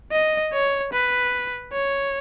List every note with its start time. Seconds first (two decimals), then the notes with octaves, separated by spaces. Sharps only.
0.12 D#5
0.53 C#5
0.93 B4
1.72 C#5